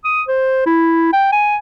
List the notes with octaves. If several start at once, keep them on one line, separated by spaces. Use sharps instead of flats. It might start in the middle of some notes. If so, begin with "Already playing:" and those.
D#6
C5
E4
G5
G#5